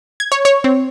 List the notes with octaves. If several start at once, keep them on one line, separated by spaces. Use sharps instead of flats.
G#6
C#5
C#5
C4